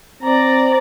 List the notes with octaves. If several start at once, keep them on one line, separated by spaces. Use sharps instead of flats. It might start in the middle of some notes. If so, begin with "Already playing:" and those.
C4 D5 A#5